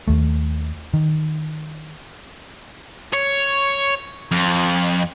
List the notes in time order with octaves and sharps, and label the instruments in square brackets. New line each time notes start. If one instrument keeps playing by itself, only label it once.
[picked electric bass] D#2 A3
D#3
[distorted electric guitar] C#5
F2